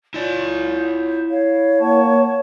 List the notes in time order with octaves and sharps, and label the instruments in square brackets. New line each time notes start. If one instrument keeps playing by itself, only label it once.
[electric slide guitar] E4 D5 [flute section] F4 C#5 G6
[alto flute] C#5 [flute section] F5
[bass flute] A#3 [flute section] F#5 A5 C#6